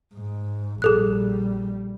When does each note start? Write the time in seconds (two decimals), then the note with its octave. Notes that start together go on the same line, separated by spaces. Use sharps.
0.14 G#2
0.82 A#1 G3 G#4 A4 F#6